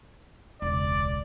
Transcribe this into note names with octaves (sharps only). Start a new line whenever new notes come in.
E1 C#2 D5